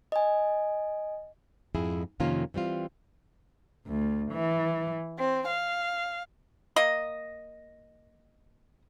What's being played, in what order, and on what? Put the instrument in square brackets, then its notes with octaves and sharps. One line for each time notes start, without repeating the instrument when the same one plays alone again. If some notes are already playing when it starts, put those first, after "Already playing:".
[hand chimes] D#5 G#5
[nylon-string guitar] F2 G#2 E4 G#4
F2 C3 D#3 A#3 C#4 F4
E3 G3 C4 F4
[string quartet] D2
E3
C4
F5
[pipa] A#3 D#5